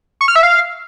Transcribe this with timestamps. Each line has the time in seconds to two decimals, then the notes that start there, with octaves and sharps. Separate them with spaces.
0.21 C#6
0.28 F6
0.36 E5
0.43 F5